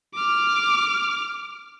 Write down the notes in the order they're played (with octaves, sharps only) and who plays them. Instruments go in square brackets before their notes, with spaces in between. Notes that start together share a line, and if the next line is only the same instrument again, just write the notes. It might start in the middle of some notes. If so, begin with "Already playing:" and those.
[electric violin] D6 F6